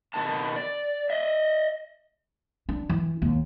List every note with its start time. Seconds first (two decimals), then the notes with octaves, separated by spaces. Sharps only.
0.14 B2 D#3 A5
0.56 D5
1.10 D#5 E5
2.69 D4
2.89 E3
3.22 D#2